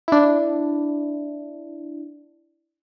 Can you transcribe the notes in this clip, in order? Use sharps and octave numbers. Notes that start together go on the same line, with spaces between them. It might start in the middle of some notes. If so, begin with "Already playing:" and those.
D4 E4